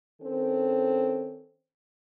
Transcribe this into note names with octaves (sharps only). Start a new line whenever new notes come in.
D#3 C4 C#4 A4